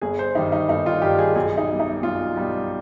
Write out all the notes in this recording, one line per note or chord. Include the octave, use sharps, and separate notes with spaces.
G1 G#4
C5
G2 D#3 G3 D#4
D#4
G1 D#4
F4
G2 D#3 G3 G4
G#4
B1 G#4
D#4
B2 G3
D#4
B1 F4
B2 G3